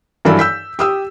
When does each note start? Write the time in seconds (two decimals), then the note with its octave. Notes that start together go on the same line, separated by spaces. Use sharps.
0.25 G2 E3 F#3 A4 B5
0.39 E6 G6 B6
0.79 G4 D#6 E6